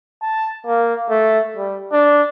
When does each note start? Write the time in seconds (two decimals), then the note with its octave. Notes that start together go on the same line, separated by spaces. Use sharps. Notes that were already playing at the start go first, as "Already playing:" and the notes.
0.23 A5
0.66 A#3
1.10 A3
1.57 G3
1.92 D4